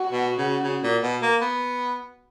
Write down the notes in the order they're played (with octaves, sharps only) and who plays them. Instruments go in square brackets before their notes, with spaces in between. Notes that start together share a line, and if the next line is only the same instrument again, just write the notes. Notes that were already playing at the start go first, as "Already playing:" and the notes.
Already playing: [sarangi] F#4
[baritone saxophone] B2
C#3
C#3
A#2
B2
A#3
B3